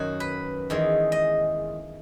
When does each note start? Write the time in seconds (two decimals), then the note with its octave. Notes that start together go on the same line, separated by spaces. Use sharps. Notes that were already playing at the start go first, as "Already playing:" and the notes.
Already playing: F#2 D#3 A#3 F#4 C#5
0.20 B4
0.70 E2 D#3 G#3
1.12 D#5